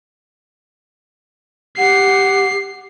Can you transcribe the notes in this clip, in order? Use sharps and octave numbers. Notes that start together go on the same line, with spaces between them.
G4 F#5 C7